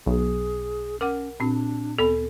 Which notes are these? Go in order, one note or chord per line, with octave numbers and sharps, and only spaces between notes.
B1 G#4
C#4 A#4 F#5 D6 F6
A#2 C4 D4 F#4
D2 B3 A4 B5